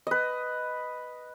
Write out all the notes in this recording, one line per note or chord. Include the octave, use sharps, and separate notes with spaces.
B4 D#5